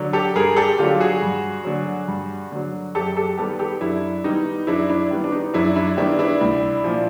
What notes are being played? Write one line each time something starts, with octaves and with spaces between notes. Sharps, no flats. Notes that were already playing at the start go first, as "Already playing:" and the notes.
Already playing: D3 F#3
G4 A4
G2 G#4 A#4
G4 A4
D3 F#3 F4 G4
F#4 G#4
G2
D3 F#3
G2
D3 F#3
F#2 G4 A4
G4 A4
D#3 G3 B3 G4 A4
G4 A4
F#2 D4 E4
D#3 G3 B3 D#4
F#2 D4 E4
D4 E4
D#3 G3 B3
D4
D#4
F#2 D4 E4
D4 E4
D#3 G3 B3 D4 E4
D4 E4
C2
A#2 F3